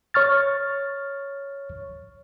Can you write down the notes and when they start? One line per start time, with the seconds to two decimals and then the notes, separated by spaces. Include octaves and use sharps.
0.14 C#5 C#6 F6 A6